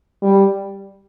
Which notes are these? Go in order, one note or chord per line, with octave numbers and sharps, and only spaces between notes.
G3